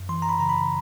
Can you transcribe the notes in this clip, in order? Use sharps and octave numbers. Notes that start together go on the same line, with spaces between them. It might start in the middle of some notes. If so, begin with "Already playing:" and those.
Already playing: F#2
E3 C6
A#5
B5
C#3 A#5
B5